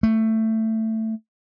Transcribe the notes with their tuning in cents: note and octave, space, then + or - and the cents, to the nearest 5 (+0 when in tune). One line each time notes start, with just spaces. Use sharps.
A3 +15